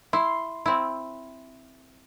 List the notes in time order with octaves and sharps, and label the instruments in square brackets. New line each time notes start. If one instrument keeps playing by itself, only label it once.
[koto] E4 [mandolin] C6
[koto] C4 E4